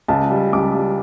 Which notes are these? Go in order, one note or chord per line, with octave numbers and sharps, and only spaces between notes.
C#2 A5
G3
C#2 D6
G3